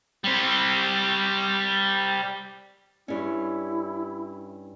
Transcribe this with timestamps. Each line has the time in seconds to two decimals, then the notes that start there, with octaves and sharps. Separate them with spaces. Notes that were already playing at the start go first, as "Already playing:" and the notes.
0.24 G3 C4
3.08 G2 C#4 E4